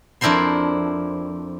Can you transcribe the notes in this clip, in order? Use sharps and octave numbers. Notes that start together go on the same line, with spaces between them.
F2 D4 E4 A#4 C5 C6